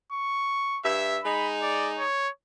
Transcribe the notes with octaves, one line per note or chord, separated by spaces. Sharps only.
C#6
G2 E5
G#3 D#4 B5
D5
C#5